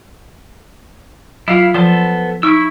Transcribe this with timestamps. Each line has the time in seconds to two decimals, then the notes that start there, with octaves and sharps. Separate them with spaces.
1.48 F#3 E4 F4 F5
1.74 F3 B3 A4 C5
2.43 D#4 E4 C#6 E6